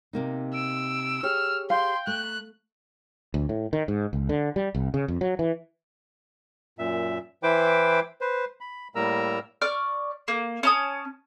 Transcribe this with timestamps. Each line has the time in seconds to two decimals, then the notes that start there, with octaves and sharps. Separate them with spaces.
0.13 C3 A#3 D#4
0.54 E6 D7
1.23 G4 G#4 C#5 F6
1.70 F5 G5 C6
2.07 A3 F#6
3.34 D2
3.49 A2
3.73 D#3
3.88 G#2
4.13 C#2
4.29 D3
4.56 G3
4.75 C2
4.94 C#3
5.08 F2
5.21 F#3
5.39 E3
6.79 F#2 A#2 E5
7.43 E3 E4 B4 C5 G5 D6
8.21 B4 C5
8.61 B5
8.95 A2 G3 A#3 A#4 A#5 E6
9.62 D5 C#6 F6
10.28 A#3
10.63 C#4 A5 D#6